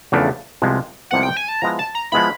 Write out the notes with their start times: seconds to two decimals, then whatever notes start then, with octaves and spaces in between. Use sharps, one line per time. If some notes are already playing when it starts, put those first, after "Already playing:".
0.12 E2 C#3 F3 A3 D4
0.62 C2 C3 F3 G#3 B3
1.11 C2 C3 F3 G#3 B3 F#5
1.23 G5
1.37 G#5
1.48 A5
1.62 F3 G#3 B3 E4 A#5
1.79 A5
1.95 A#5
2.12 F3 G#3 B3 E4 B5